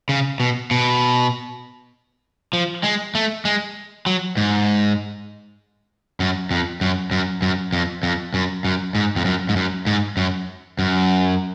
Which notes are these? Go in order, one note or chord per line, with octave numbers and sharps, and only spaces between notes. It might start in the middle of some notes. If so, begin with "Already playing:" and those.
C#3
B2
B2
F3
G#3
A3
G#3
F#3
G#2
F#2
F2
F#2
F#2
F#2
F2
F2
F#2
F#2
G#2
F2
F#2
G#2
F#2
G#2
F#2
F#2